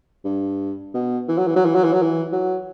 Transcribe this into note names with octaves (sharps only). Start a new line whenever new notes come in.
G2
B2
E3
F#3
E3
F#3
E3
F#3
E3
F#3
E3
F#3